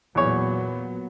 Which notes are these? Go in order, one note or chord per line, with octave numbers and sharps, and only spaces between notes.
E2 A#2 F#3 B3 C#5